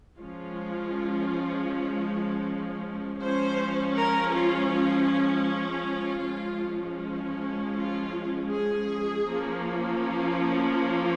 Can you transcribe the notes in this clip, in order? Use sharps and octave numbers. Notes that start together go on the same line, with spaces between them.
F3 G#3 C#4 F4
F3 G#3 C#4 C5
A#4
F4
F4
F4
F3 G#3 C#4
F4
G#4
F3 A#3 C#4
F4
F4